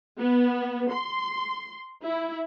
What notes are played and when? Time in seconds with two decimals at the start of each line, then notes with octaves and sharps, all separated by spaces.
0.18 B3
0.92 C6
2.04 E4